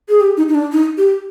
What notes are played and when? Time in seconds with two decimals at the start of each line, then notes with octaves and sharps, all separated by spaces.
0.09 G#4
0.21 G4
0.37 D#4
0.49 D#4
0.55 D4
0.72 D#4
0.98 G4